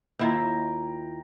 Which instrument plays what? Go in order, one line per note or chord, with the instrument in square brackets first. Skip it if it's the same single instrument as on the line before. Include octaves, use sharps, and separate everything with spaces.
[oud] D#2 E4 F4 [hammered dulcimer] G5 A#5